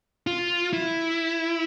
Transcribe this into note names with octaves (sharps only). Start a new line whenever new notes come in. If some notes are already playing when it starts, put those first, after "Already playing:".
F4
E4